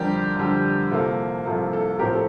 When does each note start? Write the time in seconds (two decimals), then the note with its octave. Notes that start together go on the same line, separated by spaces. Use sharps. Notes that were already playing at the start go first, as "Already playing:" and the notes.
Already playing: F2 D3 G3 G4 A#4
0.37 F2 D3 G3
0.91 C2 C3 F3 A#3 A4
1.45 C2 C3 F3 A#3 A4
1.73 A4
1.99 A2 F3 C4 G4 A#4
2.13 A4